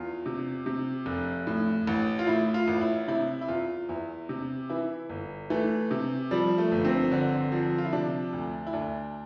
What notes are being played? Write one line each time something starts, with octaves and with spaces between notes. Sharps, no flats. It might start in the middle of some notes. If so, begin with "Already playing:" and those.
Already playing: E2 F4
C3
C3
F1
A2
A1
F4
A2 E4
F4
A1
E4
C3 E4
E4
E2 F4
E2 E4
C3
E3 E4
G1
E3 A3
C3
F3 G3
A3
G1
C4
D3
F3
F4
E4
C3 D4
D2
E4
D2 D4